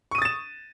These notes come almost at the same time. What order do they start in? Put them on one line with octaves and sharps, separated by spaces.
C#6 D#7 D#6 A6 E7